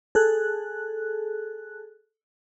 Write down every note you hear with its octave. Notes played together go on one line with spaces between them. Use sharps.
G#4 A4 F#6